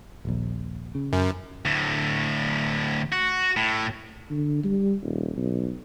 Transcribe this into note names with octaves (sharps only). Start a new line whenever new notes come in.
D#1 A#1
C#3
F#2
D2 A2
F#4
A2
D3
G3
D#1
B1